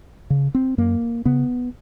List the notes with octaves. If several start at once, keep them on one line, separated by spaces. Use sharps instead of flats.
C#3
C4
F#2 A#3
C#3 B3